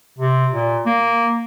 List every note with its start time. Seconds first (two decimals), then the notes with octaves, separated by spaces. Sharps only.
0.19 C3
0.53 A#2
0.86 A#3